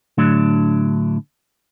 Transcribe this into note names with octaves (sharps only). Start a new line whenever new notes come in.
A2 D3 F#3 D4